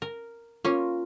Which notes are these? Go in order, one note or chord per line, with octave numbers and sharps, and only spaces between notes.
A#4
A#3 C#4 F4